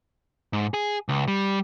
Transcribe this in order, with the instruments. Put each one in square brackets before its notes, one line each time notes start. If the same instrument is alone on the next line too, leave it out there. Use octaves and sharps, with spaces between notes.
[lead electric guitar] G#2
G#4
C#2
G3